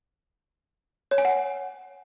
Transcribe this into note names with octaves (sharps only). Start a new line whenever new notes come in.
C#5
G#5
F#5